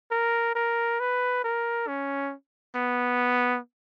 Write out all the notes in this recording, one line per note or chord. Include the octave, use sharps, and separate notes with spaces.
A#4
A#4
B4
A#4
C#4
B3